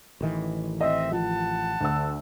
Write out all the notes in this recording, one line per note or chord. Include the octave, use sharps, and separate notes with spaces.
A1 D#3 E3
C4 D#5 E5
F3 F#5 A5
D2 E6